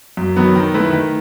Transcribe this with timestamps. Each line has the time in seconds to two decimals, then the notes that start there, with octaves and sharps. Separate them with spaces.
0.17 F#2
0.36 D#3 F#3 B3
0.55 D#3
0.74 A3 E4 B4
0.93 D#3